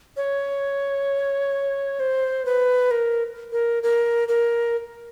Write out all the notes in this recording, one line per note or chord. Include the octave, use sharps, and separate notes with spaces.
C#5
C5
B4
A#4
A#4
A#4
A#4